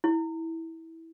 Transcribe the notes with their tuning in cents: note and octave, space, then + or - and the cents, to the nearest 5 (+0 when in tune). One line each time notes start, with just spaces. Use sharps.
E4 -15